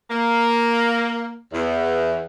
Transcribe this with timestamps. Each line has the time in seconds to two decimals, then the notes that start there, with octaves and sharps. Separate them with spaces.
0.10 A#3
1.53 E2